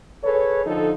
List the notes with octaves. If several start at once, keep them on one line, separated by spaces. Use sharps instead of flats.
G#4 A4 B4 C#5
D3 F3 D#4 A4